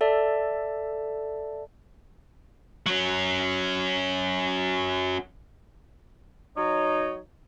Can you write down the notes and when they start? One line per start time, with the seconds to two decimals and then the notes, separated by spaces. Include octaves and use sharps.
0.01 A4 D5 E5 A5
2.86 F#3 C#4
6.56 F#3 D#4 C#5